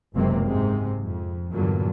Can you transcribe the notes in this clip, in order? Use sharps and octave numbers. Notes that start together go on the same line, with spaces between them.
F#1 C#2 C3 F#3 A#3 C4
G#2 C3 G#3
F2
E2 G2 A#2 D3 F#3